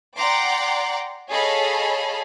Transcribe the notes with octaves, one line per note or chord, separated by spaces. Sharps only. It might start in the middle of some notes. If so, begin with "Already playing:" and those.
D5 F#5 G5 A#5 C6 D6
G#4 A4 C#5 D#5 F5 B5